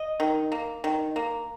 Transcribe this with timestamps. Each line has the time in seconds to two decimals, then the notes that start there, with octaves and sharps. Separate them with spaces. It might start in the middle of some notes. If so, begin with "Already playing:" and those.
Already playing: D#5
0.20 D#3
0.52 A#3
0.84 D#3
1.16 A#3